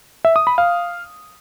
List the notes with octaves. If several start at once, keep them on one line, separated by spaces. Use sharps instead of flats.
E5
D#6
B5
F5